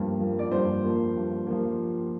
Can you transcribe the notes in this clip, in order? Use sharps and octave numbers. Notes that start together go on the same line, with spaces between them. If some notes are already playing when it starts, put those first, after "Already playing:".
Already playing: G2 F3 A#3
F3 A#3
D5
G2 C5
F3 A#3
G2
F3 A#3